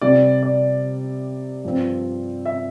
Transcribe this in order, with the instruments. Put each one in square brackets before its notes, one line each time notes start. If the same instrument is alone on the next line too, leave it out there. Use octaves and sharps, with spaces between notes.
[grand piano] C3 G3 C4 D5
D5
G2 F3 C4
E5